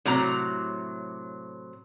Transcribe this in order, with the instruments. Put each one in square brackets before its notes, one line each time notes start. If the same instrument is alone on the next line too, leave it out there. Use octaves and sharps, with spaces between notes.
[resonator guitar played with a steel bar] A2 C3 F#3 A#5